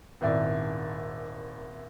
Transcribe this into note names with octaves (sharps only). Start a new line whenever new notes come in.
D#1 G#1 E4 D5